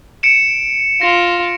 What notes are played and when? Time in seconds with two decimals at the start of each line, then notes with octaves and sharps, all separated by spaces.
0.23 C#7 D7 E7
1.01 F4 A#6